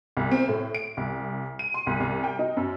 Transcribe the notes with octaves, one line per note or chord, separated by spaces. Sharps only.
C2
C4
A2
D7
C2
D#7
C6
C2
C2
G5
D#4
F#2